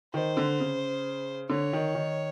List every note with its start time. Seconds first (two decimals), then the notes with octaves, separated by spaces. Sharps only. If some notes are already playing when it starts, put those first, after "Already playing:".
0.14 D#3 C5
0.37 D3
0.60 C#3
1.49 D3 C#5
1.73 D#3
1.95 D#3